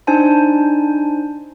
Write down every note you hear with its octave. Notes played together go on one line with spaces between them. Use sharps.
D4 D#4 C5 G#5 A5